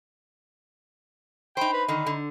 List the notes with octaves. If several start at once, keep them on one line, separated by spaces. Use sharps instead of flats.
D#4 C5 G5 B5
B4
D3 D#3 D#4
D3